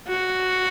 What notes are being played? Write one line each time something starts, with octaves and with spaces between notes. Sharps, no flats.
F#4